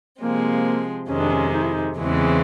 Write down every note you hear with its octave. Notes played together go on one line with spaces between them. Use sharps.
C3 F3 G#3 A#3 C4
F2 C3 D#3 G#3 C#4
D4
C#4
D#4
E4
D#4
E2 C#3 E3 G#3 C4 C#4